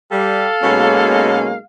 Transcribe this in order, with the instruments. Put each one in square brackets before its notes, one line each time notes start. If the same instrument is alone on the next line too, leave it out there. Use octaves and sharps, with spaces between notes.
[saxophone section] G3 [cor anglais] A4 [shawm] F5
[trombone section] B1 G#3 A#3 [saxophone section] B2 C#4